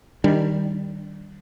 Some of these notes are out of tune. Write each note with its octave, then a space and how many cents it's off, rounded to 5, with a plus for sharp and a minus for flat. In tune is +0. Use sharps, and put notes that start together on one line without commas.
D#3 +0 G3 -5 D4 +0